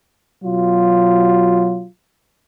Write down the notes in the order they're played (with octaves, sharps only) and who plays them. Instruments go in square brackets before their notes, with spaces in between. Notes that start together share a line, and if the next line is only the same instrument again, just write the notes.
[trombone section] B2 F#3 F4